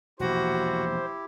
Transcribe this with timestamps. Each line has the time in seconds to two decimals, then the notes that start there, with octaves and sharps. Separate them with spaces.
0.20 E1 A#1 E4 F#4 G4 C5